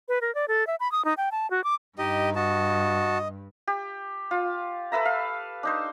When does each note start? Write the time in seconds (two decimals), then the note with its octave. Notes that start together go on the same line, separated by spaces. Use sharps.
0.08 B4
0.21 A#4
0.35 D5
0.48 A4
0.67 E5
0.80 B5
0.92 D#6
1.05 D#4
1.17 G5
1.32 A5
1.51 F#4
1.64 D6
1.98 G2 D#4 G4 D#5
2.36 F#4 D#5 A5
3.67 G4
4.31 F4
4.92 A4 B4 E5 A#5
5.05 F5
5.63 D4 D#4 C5